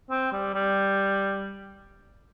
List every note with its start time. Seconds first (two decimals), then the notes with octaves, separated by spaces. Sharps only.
0.11 C4
0.32 G3
0.54 G3